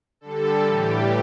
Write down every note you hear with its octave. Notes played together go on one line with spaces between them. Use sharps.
D3 G3 A4
A2 E3 G3 G4